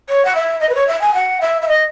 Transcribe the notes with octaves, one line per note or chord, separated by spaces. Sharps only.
C#5
F#5
E5
D#5
B4
C#5
E5
G#5
F#5
E5
E5
D#5